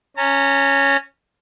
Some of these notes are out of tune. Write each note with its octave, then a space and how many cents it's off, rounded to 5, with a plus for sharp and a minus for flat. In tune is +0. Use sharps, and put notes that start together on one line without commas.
C#4 +0 A#5 -35